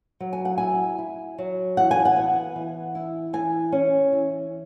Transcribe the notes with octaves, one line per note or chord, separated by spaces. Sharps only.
F#3
G#5
F#5
E4 G#5
E4
F#3
E3 F#5
G#5
F#5
B3
E3
E4
E3 G#5
C#4
E3